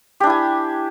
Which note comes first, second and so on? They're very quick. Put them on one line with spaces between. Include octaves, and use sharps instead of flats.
G4 D4 E4 G#5